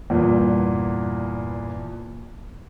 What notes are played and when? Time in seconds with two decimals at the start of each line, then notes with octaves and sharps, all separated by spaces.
0.10 E2 G2 A#2